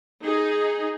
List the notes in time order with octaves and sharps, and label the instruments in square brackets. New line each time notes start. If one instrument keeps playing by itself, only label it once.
[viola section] D#4 G#4